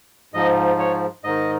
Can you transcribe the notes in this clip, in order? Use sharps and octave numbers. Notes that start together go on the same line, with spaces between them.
G#2 F3 D#5
C#5
G#2 D#3 D#5